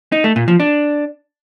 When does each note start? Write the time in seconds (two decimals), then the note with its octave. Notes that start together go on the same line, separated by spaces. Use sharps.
0.12 D#4
0.24 A3
0.36 A#2
0.48 F3
0.60 D4